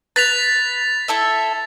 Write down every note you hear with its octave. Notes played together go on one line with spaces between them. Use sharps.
B4 A6 B6 F7
E4 A4 E5